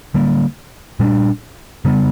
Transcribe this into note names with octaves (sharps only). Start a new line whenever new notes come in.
D3 G3 A#3
A#2 G3 B3 D4
C#3 G3 B3